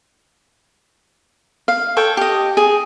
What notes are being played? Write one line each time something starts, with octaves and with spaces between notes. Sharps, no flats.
F5
A4 C#5 G5
G4 D#5
G#4